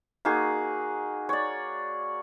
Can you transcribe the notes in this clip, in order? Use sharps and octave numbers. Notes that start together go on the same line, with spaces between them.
A#3 D#4 F#4 G#4
C#5 D5